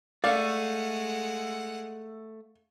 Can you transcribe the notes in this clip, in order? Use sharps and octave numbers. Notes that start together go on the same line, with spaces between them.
G#3 A3 D5 F5 F#5